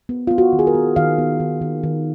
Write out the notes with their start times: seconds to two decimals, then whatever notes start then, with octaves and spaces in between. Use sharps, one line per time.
0.09 B3
0.27 B3 F4
0.38 F#4
0.53 D#3
0.59 G#4
0.67 A#4
0.74 B3
0.96 D#3 F5
1.18 B3
1.40 D#3
1.62 D#3
1.83 D#3